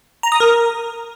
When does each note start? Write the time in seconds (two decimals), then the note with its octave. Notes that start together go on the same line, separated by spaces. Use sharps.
0.23 A#5
0.32 D#6
0.40 A#4